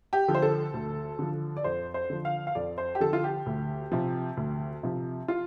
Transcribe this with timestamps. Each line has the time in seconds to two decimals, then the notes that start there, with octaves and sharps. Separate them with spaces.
0.13 G4
0.28 D3 F3
0.35 C5
0.42 A4
0.74 D2
1.19 D3 F3
1.57 D5
1.64 F2 C5
1.94 C5
2.10 D3 F3
2.25 F5
2.47 F5
2.55 F2 D5
2.78 C5
2.95 G4
3.00 D3 F3 A4
3.13 F4
3.24 G4
3.46 D2
3.92 C3 F3
4.37 D2
4.83 C3 F3
5.28 F4